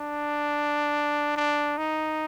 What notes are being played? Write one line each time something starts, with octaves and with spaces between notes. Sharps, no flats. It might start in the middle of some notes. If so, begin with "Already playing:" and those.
Already playing: D4
D4
D#4